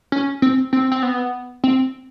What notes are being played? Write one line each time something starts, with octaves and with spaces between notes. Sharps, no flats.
C#4
C4
C4
C4
B3
C4